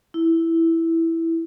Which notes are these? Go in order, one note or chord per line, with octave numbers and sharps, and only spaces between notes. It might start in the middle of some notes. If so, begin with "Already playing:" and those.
E4